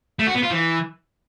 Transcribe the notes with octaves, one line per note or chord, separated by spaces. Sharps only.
A3
F#4
B3
F4
E3